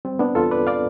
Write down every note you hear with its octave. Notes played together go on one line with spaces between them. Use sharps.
G3 C4
B3 D4
E2 F4 A4
B4 D5
D5 F5